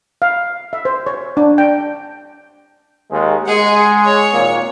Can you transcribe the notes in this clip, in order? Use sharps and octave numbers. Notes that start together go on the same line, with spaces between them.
F5
E5
C5
C#5
D4
G5
D#2 G#3
G#3 G#4 F#5
C#5 C#6
G#1 A#2 A#3